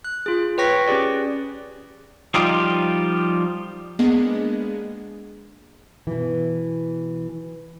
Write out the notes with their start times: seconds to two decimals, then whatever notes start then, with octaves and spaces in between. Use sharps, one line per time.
0.04 F#6
0.26 F4 G#4
0.58 B4 C#5 G5 C#6 A#6 B6
0.87 C#4 G4 G#4 D5
2.34 F3 G3 D#4 F4 G4
3.99 G#3 A#3 B3 D4 G#4 D#5
6.07 B2 E3